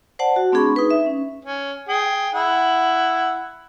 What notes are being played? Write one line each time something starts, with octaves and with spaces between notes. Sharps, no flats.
C5 D5 F#5 A5
F#4
A3 C4 D4 G#4 B5 C#6
D#4 B4
E5
C#4
C#4
G#4 G5
E4 F#5